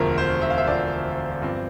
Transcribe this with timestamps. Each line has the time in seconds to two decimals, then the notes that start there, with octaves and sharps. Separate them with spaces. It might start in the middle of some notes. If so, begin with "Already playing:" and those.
Already playing: E1 D2 D3 F3 A#4
0.18 C5
0.42 E5
0.50 F5
0.58 E5
0.67 E1 D2 D3 F3 D5
1.42 G2 F3 C4